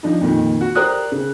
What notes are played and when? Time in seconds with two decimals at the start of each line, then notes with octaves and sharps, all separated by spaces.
0.03 F3 D4 D#4
0.21 F2 A#2 D#3
0.61 F#4
0.75 G4 A#4 C5 D5 D#6 F#6
1.12 C#3